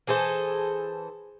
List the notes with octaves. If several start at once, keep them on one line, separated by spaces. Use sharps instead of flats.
E3 G#4 A4 C5